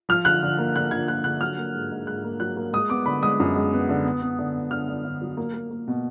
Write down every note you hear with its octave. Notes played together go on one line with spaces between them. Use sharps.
F3 F6
D3 F#6
D3
A#3
D3 F#6
D3 G#6
A#3 F#6
D3 F#6
F#3 F6
A#3
G#2
G#2
G#2 F#6
A#3
F#3 F#6
A#3
G#3 D#6
B3 D6
D3 B5
G#3 D#6
F#2
G#3
B3
D3
B3
B3
D3
B3
D3 F6
D3
D3
F#3
A#3
A#3
A#3
B2